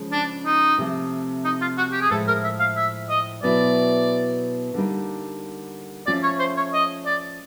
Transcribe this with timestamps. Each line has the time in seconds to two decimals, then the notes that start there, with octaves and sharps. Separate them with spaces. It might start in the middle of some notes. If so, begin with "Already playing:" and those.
Already playing: C#3 F3 G#3
0.12 D4
0.46 D#4
0.78 C3 F3 A3
1.45 D#4
1.61 F4
1.77 F#4
1.92 G4
2.01 G#4
2.11 A2 F3 G#3 A4
2.27 A#4
2.44 E5
2.60 F5
2.77 E5
3.09 D#5
3.43 B2 F#3 B3 E4 D5
4.74 D3 G3 A#3 D#4
6.06 F3 A3 C#4 F4 D5
6.23 C#5
6.39 C5
6.57 C#5
6.73 D#5
7.06 D5